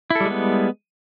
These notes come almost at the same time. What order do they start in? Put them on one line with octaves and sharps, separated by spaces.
E4 A4 G3 G#3 B3